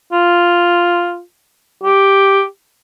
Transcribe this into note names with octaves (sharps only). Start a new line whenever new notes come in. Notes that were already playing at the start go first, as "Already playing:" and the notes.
F4
G4